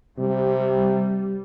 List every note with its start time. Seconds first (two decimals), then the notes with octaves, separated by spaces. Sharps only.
0.19 C3 G3